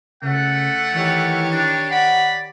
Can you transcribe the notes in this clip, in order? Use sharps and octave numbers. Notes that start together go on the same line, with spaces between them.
C#3 A3 F#5
D#3 E3 G4 C#5
D4
D5 F#5 B5